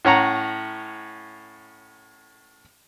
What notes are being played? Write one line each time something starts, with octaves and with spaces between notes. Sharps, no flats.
A2 C#4 F#5 A#5